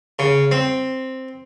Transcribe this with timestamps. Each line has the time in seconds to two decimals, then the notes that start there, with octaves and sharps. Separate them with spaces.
0.19 C#3
0.51 C4